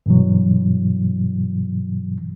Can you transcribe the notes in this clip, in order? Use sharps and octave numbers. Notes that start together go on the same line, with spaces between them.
G2 B2 E3 F#3